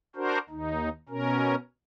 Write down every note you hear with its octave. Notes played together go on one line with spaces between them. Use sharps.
D4 F#4 A#4 C5
D#2 D#4
B2 C#4 A#4